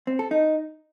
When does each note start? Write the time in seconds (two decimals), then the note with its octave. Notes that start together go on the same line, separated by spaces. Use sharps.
0.07 C4
0.19 A4
0.31 D#4